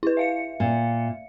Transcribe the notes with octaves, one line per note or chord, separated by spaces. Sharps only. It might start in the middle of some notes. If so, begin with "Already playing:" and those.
E4 B4
E5 F5 C#7
A#2